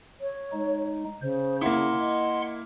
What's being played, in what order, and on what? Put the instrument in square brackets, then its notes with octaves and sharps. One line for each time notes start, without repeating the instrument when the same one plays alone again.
[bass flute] C#5
[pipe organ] G#3 D#4
[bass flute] C#3 [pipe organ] C5
[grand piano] A#3 E4 [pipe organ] F#5 C6
[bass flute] D#5